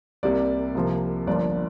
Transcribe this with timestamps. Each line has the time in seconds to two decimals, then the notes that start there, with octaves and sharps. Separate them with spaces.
0.23 C2 C3 G3 A#3 D5
0.75 C2 C3 F3 A#3
1.27 G1 G2 F3 A#3 D5